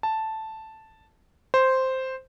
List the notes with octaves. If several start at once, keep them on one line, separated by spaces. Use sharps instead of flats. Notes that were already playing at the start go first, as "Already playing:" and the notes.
A5
C5